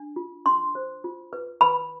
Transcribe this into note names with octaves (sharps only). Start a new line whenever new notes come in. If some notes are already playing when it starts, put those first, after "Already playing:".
Already playing: D4
F4
D4 C6
C5
F4
B4
B4 B5